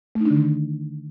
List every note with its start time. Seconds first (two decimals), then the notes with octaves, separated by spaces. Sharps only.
0.15 A3
0.20 D#4
0.25 D4
0.30 D3
0.35 D#3